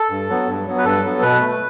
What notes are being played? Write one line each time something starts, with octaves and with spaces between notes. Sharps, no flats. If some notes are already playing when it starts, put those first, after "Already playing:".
Already playing: A4
G2
F#3 B3
G2
F#3 B3
B4
G2 A4
F#3 B3
B2 B4
A3